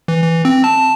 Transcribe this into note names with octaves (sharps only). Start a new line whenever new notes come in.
E3
E3
C4
A5